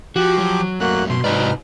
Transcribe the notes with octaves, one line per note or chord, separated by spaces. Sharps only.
F3 F#4 G4 D6
F#3
F#2 A3 A#3 F#4 F#6
B2 C6
G#2 C3 F#3 D#4 B4 D5 F6